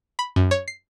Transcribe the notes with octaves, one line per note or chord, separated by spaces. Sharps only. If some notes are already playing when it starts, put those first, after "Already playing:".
B5
F#2
C#5
C7